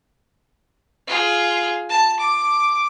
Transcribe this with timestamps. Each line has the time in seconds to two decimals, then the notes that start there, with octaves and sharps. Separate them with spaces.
1.07 F4 G#4
1.90 A5
2.20 D6